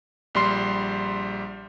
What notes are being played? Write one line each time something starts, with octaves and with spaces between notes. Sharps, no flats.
A#1 G3 C6 C7